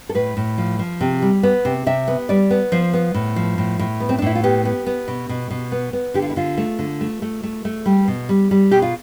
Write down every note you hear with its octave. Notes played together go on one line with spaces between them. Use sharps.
A4
A2 B4
A2
F3
F3
C3
G3
B3
C3
C3 E5
B3
G3 D5
B3
F3 C5
B3
A2
F3
A2
A2
B3
C4
D4
A2 E4
F4
B3 G4
B3
B3
B2
B2
B2
B3
B3
D3 G4
F4
E4
D3 F4
A3
D3
A3
A3
A3
A3
G3
B2
G3
G3
B2 G4
F4